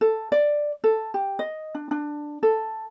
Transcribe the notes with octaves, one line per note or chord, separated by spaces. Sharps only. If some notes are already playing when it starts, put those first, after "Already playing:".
A4
D5
A4
G4
D#5
D4
D4
A4